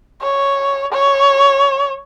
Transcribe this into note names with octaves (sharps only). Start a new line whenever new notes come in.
C#5
C#5